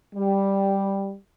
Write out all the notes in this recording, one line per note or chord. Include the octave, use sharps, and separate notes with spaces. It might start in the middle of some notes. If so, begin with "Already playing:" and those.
G3